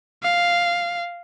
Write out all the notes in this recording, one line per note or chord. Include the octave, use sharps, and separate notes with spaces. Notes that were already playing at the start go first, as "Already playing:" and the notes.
F5